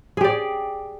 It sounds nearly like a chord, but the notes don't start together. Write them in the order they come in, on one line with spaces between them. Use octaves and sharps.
G#4 G4 D5